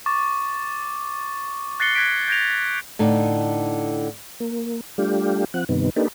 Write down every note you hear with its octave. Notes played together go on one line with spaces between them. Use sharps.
C#6 D6 A6
F#6 A6 A#6 C7 C#7 G7
F#6 G#6 A#6 B6 D7 G7
G6 G#6 A#6 D7 F7
A2 D3 D#4
A#3
G3 A3 D4 F4 G4
F3 C4 F#5
G2 C3 D#3 B3
A#3 D4 D#4 G4 A4 B4